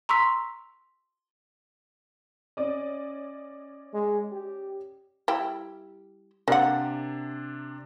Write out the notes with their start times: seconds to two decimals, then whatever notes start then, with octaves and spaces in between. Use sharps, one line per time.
0.09 A#5 C6 C#6 E6 B6
2.57 C#4 D5 D#5
3.94 G#3
4.32 G4
5.28 G3 E4 G4
6.48 C3 A#3 D4 F#5